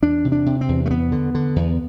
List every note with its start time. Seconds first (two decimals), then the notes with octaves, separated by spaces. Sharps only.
0.02 E2 D4
0.25 C3
0.32 D4
0.46 C3
0.61 C4
0.69 E2
0.86 A3
0.91 E2 B3
1.12 D3
1.35 D3
1.56 E2